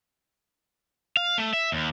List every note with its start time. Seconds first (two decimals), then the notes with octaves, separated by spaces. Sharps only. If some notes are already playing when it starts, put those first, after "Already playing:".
1.17 F5
1.38 A3
1.53 E5
1.72 D#2